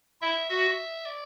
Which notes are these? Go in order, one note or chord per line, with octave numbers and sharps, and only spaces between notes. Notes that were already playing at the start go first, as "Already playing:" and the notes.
E4 E5
F#4 E5
D5